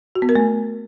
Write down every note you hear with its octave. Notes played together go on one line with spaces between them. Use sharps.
F#4
B3
A#4
A3